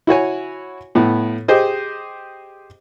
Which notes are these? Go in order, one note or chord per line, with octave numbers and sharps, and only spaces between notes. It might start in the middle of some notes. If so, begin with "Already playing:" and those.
E4 F#4 C#5 G#5
A2 B3 E4
G4 G#4 C5 D#5